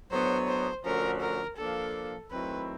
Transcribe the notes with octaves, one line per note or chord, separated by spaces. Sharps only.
A2 F#3 B3 D4 C5
C5
D3 F3 A3 C#4 F#4 A#4
A#4
F3 A#3 D4 A4
D#3 F#3 A3 C4 E4 B4